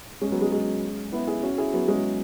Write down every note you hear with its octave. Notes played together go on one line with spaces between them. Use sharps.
G#3 C#4
F#3 B3
G#3
G#3 C#4
B3 E4
E4 G#4
C#4 F#4
E4 G#4
F#3 B3
G#3 C#4